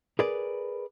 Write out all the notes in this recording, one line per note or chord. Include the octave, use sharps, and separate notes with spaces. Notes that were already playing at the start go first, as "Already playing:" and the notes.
G#4 A#4 B4 D5